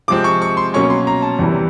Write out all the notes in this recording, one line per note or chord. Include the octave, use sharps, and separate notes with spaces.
C3 F3 G#3 C4 D6
C#6
C#6
C6
B2 F#3 A#3 C#4 C#6
C6
A#5
A5
E2 C3 E3 G3